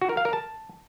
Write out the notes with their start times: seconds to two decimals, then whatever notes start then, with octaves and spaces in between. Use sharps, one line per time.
0.01 F#4
0.09 A#4
0.17 F5
0.25 A#4
0.33 A5